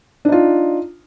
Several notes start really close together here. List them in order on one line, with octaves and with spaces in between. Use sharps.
D4 D#4 F4